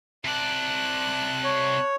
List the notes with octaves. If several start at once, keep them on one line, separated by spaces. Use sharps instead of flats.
C3 D5 A5 F#6
C#5